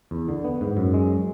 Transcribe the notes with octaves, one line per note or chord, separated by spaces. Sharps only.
E2
D3
B3
G#2
F#2
G#3